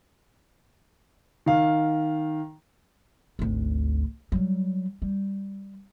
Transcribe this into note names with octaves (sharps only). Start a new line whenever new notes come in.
D#3 F5
G#1 D2
F#3 G3
G3